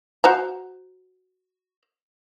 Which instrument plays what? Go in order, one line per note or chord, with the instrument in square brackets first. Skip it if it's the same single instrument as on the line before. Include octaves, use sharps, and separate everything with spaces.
[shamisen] F#4 C5 A#5